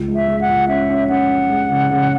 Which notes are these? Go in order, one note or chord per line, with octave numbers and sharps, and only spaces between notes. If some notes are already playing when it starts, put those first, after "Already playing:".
Already playing: C#2
G#3
E5
G#3
F#5
C#2
C#4 E5
C#4
C#4 F#5
C#4
G#3
C#3
C#3